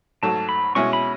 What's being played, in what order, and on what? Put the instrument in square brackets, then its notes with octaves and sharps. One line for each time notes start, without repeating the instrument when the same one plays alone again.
[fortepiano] G#2 F#3 A3 [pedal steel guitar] A5
[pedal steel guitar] B5
[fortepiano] B2 G#3 C#4 E4 [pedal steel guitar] C#6
[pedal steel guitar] B5